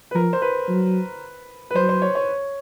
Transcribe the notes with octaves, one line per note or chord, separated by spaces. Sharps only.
B4
F3 A#4
C5
B4
F#3
B4
F#3 C5
C5
C#5
C#5